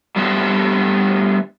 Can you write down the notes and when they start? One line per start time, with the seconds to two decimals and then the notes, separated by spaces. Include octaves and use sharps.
0.16 G3 A3 B3 D4 C5